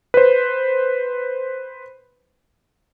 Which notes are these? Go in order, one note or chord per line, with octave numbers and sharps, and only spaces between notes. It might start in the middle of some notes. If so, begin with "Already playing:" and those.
B4 C5